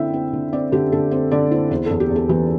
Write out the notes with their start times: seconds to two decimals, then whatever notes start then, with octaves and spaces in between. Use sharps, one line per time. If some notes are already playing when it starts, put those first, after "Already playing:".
Already playing: D3 C4 E4 E5 G5
0.13 C4
0.33 D3
0.53 C4 D5
0.72 D3 G4
0.92 D3 A4
1.11 C4 C5
1.31 D3 D5
1.51 E4 C5
1.71 E2 C5
1.86 E2 A4
2.00 G4
2.10 E2
2.16 A4
2.29 E3 G4